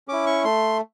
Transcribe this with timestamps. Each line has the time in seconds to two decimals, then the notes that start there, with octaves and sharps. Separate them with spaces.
0.08 C#4 E4 D6
0.26 C#6
0.45 A3 C6